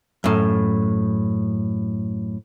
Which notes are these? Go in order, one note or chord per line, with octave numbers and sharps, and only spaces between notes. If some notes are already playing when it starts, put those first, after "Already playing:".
F#2 A2